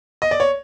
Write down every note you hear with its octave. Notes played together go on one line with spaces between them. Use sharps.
D#5
D5
C#5